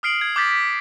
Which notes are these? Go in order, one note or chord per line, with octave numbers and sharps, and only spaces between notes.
D#6 F6 C7 D7 F#7
G#6
D6 F6 G6 A6 B6
B6